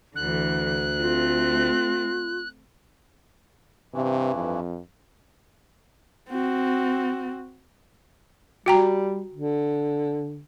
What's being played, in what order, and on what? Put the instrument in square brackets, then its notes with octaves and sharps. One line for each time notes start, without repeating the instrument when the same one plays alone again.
[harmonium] D2 [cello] D3 E3 [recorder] F#6
[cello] A3 C4 [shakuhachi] F4
[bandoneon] G2 E3 [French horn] C3
[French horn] F2
[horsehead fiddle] C4 F#4
[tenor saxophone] G3 [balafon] F#4 G5 A#5
[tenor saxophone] D3